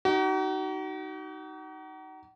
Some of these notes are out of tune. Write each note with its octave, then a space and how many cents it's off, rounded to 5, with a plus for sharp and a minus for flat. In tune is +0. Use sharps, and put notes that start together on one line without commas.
D#4 +0 F#4 +40